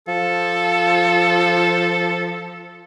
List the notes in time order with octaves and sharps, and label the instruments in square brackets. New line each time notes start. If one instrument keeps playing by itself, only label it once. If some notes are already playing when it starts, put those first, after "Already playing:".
[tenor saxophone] F3 [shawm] A4